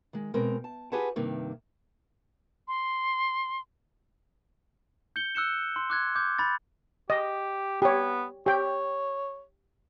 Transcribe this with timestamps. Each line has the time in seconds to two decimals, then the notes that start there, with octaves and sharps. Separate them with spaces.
0.13 D#3 G#3
0.34 B2 G#3 C4 A#4
0.64 A5
0.92 F4 G4 G#4 B4 F#5 A5
1.16 G2 C3 D#3 A#3
2.68 C6
5.16 G6 C#7 G7
5.35 E6 F#6 C#7 E7
5.76 C6
5.90 D6 F#6 G#6
6.16 D6 G6
6.38 B5 A6
7.10 G4 D#5
7.82 B3 G4 C#5
8.46 G4 C#5 G5